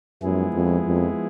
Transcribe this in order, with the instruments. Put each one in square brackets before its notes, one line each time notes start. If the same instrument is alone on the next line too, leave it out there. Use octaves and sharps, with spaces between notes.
[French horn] F#2 [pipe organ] F3 G#3 B3 E4 G#4
[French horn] F2
F2